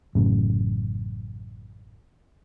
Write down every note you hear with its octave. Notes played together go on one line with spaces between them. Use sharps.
A1 F#2 A2 C#3